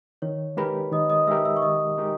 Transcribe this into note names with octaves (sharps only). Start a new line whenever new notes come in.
D#3 C#5
G#3 D#4 G4 A#4 B4 B5
D#3 D#5 D#6
D#5 D#6
G#3 D#4 G4 A#4 E5 E6
E5 E6
C#6
D#3 D#5 D#6
G#3 D#4 G4 A#4